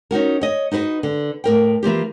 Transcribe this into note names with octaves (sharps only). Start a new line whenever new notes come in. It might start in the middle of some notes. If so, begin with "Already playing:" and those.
C#4 D#4 F#4 A#4
C#5 D#5
D#4 F#4 B4 C5 D#5
D3
A2 A#4 G5
E3 A#3 F4 G4